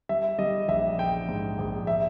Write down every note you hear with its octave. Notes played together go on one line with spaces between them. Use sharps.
G3 E5
G3 D#5
A#1 E5
A#1 G5
G#2
A#1
E5